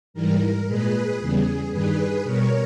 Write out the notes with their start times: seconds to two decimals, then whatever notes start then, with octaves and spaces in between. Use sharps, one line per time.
0.14 G#2 E3 G3 A#4
0.67 A#2 G#3 G#4 B4
1.20 E2 C#3 G3 G#4
1.71 G2 D#3 G3 G#4 B4
2.23 B2 G3 A#4 C#5